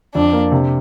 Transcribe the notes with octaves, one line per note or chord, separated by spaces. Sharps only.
F2 D4
A#3
C3